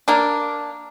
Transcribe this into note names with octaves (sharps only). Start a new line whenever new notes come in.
A#3 D4